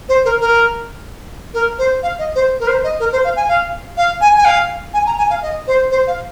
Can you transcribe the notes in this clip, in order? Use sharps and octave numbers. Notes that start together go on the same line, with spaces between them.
C5
A#4
A#4
A#4
C5
F5
D#5
C5
A#4
C5
D#5
A#4
C5
F5
G#5
F5
F5
G#5
G#5
F5
G#5
A#5
G#5
F5
D#5
C5
C5
F5